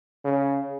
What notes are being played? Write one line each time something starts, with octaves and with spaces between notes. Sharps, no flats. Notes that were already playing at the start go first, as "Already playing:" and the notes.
C#3